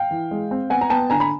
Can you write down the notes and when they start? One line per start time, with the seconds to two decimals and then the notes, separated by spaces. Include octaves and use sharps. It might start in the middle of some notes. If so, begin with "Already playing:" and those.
Already playing: F5 G5
0.11 E3
0.31 G#3
0.51 C4
0.70 B3 F#5 G#5
0.81 A#5
0.90 B3 G5 A5
1.10 D3 G#5 A#5
1.20 B5